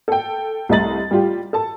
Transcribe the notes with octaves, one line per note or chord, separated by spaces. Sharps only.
A4 G5
C2 A3 D#5 A#5 A6 F#7
G3 F4 G4
A4 A5